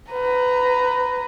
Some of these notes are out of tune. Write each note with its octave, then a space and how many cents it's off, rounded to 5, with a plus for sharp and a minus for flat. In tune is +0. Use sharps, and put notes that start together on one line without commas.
B4 +20 A#5 +0